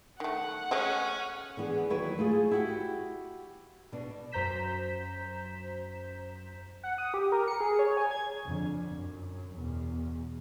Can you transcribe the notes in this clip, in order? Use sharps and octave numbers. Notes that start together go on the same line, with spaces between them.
D#3 A3 F#5
A3 C#4 G#4 D#5
D3 E3 B3 G#4
D#2 F#3 E4 B4 C#5
A3 E4 F4 G#4
E4 F#4 G4
B2 D4
F#2 C5 A#5 G6 B6 E7
F#5
D#6
G4
A#4
C#7
G#4
C#5
G#5
G#6
F2 D3
F#2
E2 B2